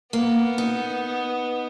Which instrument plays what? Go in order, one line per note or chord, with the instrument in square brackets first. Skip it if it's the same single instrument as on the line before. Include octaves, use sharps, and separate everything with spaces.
[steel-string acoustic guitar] A#3 [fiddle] B3
[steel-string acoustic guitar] D#4